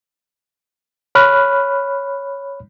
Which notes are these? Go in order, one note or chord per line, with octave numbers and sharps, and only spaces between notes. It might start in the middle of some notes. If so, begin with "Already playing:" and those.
C#5 B5 F6 F#6